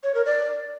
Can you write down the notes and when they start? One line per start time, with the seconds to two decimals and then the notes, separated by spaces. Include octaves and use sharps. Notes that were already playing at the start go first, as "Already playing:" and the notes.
0.03 C#5
0.15 A#4
0.26 D5